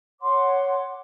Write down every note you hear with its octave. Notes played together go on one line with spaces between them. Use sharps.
C#5 F#5 C6 D6